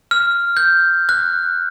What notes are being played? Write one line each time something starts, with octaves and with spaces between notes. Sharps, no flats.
F6
G6
F#6